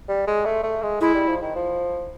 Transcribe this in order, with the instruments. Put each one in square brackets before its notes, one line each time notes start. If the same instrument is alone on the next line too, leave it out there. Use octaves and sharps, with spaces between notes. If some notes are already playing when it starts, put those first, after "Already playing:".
[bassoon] G3
G#3
A3
A3
G#3
[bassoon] G#3 [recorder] E4
[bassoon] G3
F3
D#3
F3